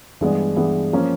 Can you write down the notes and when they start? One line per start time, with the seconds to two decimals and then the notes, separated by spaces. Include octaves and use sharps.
0.21 G2 E3 G#3 B3 D4
0.56 G2 E3 G#3 B3 D4
0.93 F3 A#3 C#4